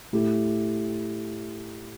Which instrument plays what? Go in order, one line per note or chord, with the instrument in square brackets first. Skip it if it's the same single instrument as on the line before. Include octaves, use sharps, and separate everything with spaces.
[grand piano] A2 A3 E4 G4